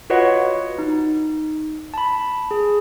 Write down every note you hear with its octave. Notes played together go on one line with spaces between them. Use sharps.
F4 F#4 B4 C#5 D#5 F#5
D#4
A5 B5
G#4